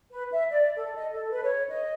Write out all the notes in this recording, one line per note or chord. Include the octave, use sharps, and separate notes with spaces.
B4
E5
D5
A4
D#5
A4
B4
C#5
D#5